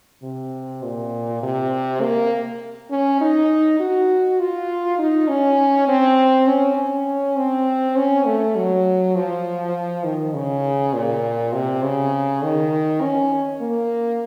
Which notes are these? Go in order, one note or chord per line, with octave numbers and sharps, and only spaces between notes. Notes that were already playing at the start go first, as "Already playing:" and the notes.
C3
A#2
C3
A#3
C#4
D#4
F#4
F4
D#4
C#4
C4
C#4
C#4
C4
C#4
A3
F#3
F3
D#3
C#3
A#2
C3
C#3
D#3
C#4
A#3